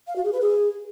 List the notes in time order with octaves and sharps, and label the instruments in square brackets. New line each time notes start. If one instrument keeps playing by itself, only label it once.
[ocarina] F5
F#4
G#4
B4
G#4